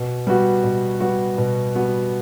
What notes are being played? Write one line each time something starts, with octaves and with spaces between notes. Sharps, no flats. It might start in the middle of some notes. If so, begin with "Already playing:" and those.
Already playing: B2
G3 B3 F#4
B2
G3 B3 F#4
B2
G3 B3 F#4